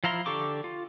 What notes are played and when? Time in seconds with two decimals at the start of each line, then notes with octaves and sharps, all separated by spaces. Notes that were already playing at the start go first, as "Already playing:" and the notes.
0.04 F3 E4 F5 A#5 C6
0.26 D3 G4 A4 C#6 D6
0.64 F4